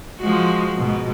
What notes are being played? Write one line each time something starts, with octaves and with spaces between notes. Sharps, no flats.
F3 G#3 F#4
G#2 B2